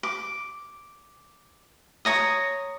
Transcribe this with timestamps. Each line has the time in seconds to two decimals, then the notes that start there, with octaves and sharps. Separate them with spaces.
0.03 D6
2.05 C#5 A#5 D#6